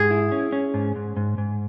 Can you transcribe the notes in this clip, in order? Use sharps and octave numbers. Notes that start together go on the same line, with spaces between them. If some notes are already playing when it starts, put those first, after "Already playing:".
Already playing: G#2 G#4
E4
C#4
C#4
G#2
G#2
G#2
G#2